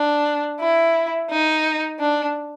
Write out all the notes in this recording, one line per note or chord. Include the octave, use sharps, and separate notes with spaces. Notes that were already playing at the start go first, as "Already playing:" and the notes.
Already playing: D4
E4
D#4
D4